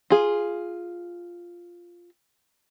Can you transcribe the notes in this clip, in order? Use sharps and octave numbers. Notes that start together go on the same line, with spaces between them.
F4 G#4